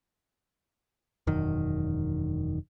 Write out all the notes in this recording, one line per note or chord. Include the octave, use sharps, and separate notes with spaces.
E1 F#2 D#3